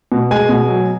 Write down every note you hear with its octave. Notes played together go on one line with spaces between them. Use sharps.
B2
G#3 G#5
B2
F#3